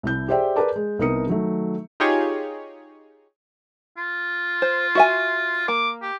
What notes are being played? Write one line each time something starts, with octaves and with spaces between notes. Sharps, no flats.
C2 E4 G6
G4 G#4 C5 D5 E5 G5
G#4 A#4 B4 D5 A5 D6
G#3
C2 B3 D#4 A#4 D#6 C#7
D#3 F#3 A3
D#4 F4 G4 G#4 C#5
F4
C5
F#4 E5 G#5
A#3 D6
G4